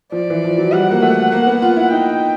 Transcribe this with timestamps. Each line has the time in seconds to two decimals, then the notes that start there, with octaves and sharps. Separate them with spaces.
0.12 F3 D5
0.30 E3
0.44 F3
0.58 F#3
0.72 G3 F#5
0.91 A#3
1.02 A3
1.32 A#3
1.47 B3
1.62 F4
1.77 E4
1.92 D#4 G5